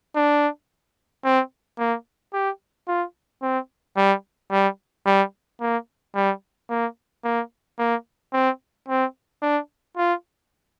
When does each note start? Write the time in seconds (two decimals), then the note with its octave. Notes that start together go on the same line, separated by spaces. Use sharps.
0.15 D4
1.25 C4
1.78 A#3
2.33 G4
2.88 F4
3.42 C4
3.97 G3
4.51 G3
5.06 G3
5.61 A#3
6.15 G3
6.70 A#3
7.24 A#3
7.79 A#3
8.33 C4
8.88 C4
9.42 D4
9.97 F4